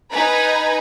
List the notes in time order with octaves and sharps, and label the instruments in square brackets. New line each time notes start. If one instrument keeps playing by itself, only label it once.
[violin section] D#4 B4 G#5 A#5 B5